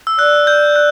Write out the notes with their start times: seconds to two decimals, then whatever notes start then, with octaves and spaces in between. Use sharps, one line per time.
0.07 E6
0.19 D5 F#6
0.47 G6
0.76 F#6